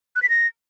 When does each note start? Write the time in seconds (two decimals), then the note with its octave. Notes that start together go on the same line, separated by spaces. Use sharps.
0.16 F#6
0.23 B6
0.29 A#6